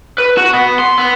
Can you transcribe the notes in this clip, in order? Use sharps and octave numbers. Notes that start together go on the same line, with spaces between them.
B4
F#4
B3
C6
B3